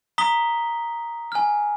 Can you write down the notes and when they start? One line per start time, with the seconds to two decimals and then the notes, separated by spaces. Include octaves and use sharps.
0.18 A#5 D#6 B6 G7
1.32 G#5 F6